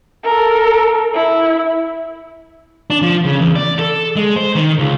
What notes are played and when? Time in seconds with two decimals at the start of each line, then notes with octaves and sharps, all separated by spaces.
0.24 A4 A#4
1.14 E4
2.90 D4
3.02 F3
3.25 C#3
3.39 E2
3.55 D5
3.79 A4
4.16 G#3
4.36 C5
4.55 D#3
4.79 C#2